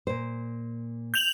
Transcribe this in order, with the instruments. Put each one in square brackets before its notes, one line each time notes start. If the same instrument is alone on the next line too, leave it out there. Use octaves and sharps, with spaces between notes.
[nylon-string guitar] A#2 C5
[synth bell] G6 F7 F#7